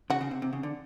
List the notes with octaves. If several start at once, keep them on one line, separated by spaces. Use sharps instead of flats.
C#3 F#4
C#3
C3
C3
C#3
D3